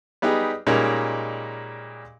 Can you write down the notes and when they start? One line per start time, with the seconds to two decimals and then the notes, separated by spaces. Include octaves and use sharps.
0.22 G3 B3 D#4 G4 G#4
0.67 A#2 G3 G#3 C#4 D#4 A#4